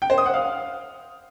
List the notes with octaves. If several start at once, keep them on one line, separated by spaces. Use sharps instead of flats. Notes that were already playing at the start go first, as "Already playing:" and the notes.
G5
C5
D#6
F#5
F5